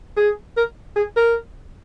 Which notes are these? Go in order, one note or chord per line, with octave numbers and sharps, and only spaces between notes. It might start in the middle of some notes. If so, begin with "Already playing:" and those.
G#4
A#4
G#4
A#4